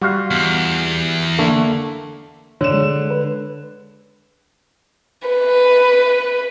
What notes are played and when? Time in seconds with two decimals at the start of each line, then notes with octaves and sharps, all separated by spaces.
0.01 G3 F4 F#4 F5
0.31 E2
1.39 D3 A3 A#3
2.61 D3 C#5 E7
2.74 G#3
3.11 B4
5.28 B4